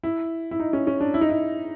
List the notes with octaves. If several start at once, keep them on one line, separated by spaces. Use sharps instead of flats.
E4
E4
D#4
C#4
C#4
D4
E4
D#4
E4